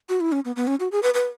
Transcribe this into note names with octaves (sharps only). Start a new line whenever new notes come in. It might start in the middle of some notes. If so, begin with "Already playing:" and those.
F#4
E4
C#4
B3
B3
C#4
F#4
G#4
B4
B4